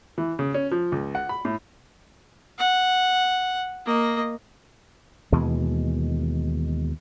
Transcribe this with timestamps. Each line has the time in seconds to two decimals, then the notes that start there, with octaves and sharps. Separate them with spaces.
0.18 E3
0.39 C#3
0.54 C#4
0.71 F3
0.92 C#2
1.15 F#5
1.29 B5
1.45 A2
2.59 F#5
3.86 A#3 D#5
5.32 D#2 B2 E3 G#3